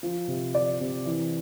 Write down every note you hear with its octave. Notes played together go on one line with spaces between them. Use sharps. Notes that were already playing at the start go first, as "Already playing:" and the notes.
F3
C3
F3 D5
C3
E3